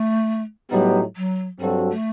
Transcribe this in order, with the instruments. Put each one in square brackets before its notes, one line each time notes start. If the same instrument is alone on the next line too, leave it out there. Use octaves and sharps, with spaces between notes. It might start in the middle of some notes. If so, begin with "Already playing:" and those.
Already playing: [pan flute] A3
[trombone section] A2 F#3 B3 D#4 G4 [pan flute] G3
[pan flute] F#3
[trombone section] G2 F#3 C4 F#4 A4 [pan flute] G3
[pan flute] A3